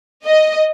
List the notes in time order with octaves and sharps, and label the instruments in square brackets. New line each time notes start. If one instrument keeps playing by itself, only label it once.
[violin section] D#5